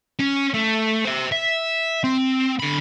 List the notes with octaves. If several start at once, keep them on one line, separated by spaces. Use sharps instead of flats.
C#4
A3
C5 E5
E5
C4
D3 B5